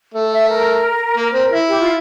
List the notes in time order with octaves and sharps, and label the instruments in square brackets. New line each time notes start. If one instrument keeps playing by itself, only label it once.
[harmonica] A3
[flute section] E5
A#4
[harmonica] A#3
C4
E4
[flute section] G4
F4